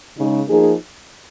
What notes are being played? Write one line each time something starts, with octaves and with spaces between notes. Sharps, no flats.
C#3 G#3 D#4
F3 A#3 D#4 G#4